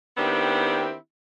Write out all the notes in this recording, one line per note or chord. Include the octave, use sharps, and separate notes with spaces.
D#3 B3 C4 D4 E4 G4